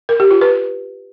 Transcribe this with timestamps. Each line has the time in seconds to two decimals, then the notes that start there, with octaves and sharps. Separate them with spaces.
0.09 A#4
0.20 G4
0.31 F4
0.41 B4